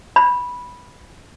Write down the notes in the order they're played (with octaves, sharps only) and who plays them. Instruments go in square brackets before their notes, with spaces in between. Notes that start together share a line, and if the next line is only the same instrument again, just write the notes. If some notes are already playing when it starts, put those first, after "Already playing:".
[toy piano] B5